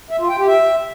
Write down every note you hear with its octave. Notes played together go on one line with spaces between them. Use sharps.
E5
F4
G5
G4
E5